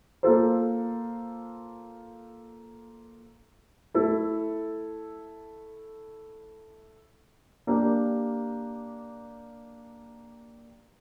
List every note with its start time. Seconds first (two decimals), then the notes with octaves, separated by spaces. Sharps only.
0.23 A#3 F4 A4 C5
3.94 A3 E4 A4
7.67 A#3 D4 G4